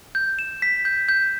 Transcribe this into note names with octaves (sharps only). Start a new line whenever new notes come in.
G6
E7
B6
G6
G6